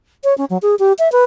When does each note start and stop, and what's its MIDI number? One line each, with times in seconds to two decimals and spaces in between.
0.24 0.36 73
0.38 0.45 61
0.50 0.58 54
0.62 0.75 68
0.79 0.93 67
0.99 1.11 76
1.12 1.24 71